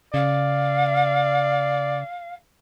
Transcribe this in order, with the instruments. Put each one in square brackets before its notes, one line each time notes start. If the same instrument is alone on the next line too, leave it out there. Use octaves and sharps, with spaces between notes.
[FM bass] C#3 [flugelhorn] D5 [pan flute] F5